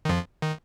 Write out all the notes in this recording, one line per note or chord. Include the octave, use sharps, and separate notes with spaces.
D#3
F2 F3
D#3